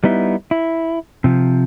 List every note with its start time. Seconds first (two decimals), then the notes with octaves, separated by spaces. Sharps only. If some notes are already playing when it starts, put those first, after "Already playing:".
0.04 G3 B3 D#4 E4
0.51 E4
1.24 C3 F3